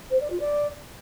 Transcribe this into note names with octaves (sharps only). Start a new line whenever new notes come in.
C5
D5
F4
D5